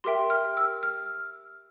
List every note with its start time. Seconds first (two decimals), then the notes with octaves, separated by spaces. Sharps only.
0.04 G4 A#4 E5 G5 C6
0.30 F6
0.57 E6
0.83 F6